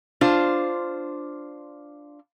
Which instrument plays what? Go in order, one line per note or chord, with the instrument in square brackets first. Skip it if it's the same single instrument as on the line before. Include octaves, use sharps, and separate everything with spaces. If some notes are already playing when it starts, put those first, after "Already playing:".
[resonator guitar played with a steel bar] D4 F4 C5